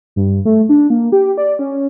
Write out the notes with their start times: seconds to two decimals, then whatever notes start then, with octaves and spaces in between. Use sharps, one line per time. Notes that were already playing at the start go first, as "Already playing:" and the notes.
0.16 G2
0.45 A3
0.69 D4
0.90 A#3
1.12 G4
1.38 D5
1.59 C#4